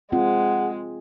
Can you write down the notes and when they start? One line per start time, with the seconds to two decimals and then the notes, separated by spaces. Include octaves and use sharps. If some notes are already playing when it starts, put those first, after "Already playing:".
0.12 G#3 C4 F4 F#5